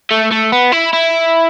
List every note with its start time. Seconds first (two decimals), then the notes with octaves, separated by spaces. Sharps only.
0.11 A3
0.32 A3
0.52 B3
0.72 E4
0.93 E4